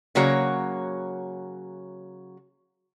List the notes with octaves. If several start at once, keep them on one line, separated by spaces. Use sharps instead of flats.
C#3 F#3 A#3 F#4 C#5